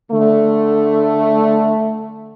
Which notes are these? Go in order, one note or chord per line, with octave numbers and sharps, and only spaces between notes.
D3 A3